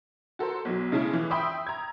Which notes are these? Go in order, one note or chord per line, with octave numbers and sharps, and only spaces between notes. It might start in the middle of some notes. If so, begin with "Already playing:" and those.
F#4 A4 A#4 C5
B1 F#3
C#3 G#3 A3 C#4 E4
E3 F3
E5 G5 B5 C6 D#6 E6
A#5 G#6